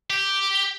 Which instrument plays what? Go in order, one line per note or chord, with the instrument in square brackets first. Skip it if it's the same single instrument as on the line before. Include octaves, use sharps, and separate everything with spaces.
[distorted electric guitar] G4